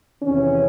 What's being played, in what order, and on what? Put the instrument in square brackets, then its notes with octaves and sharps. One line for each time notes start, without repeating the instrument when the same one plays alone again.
[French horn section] E2 C3 D#3 C#4